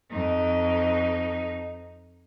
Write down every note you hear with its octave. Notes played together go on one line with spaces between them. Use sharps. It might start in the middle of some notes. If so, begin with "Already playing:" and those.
F2 D#4